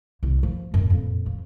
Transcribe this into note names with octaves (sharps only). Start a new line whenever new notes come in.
C2 E4
F3
F#2 A2
F2 A#2
F3